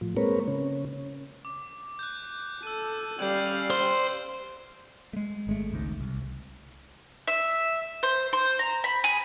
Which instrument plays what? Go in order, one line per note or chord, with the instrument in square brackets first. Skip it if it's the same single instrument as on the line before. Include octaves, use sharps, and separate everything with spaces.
[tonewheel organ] A2 F3
G#3 A#3 C4 A#4 B4 C#5
C#3 C#4
[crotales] D6
F#6 G6
[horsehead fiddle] A4 [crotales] E6 D#7
[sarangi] G3 [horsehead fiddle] C#4 F5 [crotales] G6 D7 F#7
[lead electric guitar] C5
[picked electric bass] G#3 A3
G#1 G#3 A3
G#1 C#2 G#2
C2
[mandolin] E5
C5
C5
A#5
B5
G#4